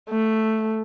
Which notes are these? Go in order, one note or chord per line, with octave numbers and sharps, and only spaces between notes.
A3